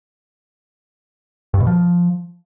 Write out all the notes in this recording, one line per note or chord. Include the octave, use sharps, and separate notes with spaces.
G2
B2
F3